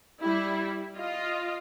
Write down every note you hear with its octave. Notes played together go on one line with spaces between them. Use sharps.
G3 E4
F4 D#5